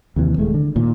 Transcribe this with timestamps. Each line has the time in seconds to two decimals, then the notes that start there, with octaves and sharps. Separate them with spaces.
0.16 D#2 C3 E3
0.38 D#1 G#3 A3
0.54 D3
0.76 A#2 D#3